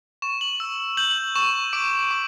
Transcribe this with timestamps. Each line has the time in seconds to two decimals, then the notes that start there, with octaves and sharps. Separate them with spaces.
0.22 C#6 E7
0.41 F#7
0.60 E6
0.97 G6 F#7
1.36 C#6 E7
1.73 D6 D7
2.11 D6